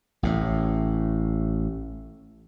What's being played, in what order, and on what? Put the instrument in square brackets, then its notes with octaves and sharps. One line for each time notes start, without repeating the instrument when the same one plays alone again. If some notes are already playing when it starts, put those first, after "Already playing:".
[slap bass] A1 A2